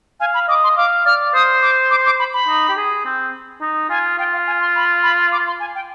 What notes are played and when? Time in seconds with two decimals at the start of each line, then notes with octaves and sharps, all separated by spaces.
0.20 F5 G#5
0.34 B5
0.48 D#5 D6
0.64 C6
0.77 F5 D6
1.06 D5 F6
1.34 C5 D#6
1.62 D6
1.91 D6
2.06 D6
2.19 B5
2.34 B5
2.48 D#4
2.69 G4
2.77 G#4
3.05 C4
3.61 D#4
3.89 F4 G#5
4.18 F4 G5
4.32 F5
4.47 G#5
4.60 C6
4.76 B5
5.03 B5
5.32 D6
5.47 C6
5.60 G#5
5.75 G5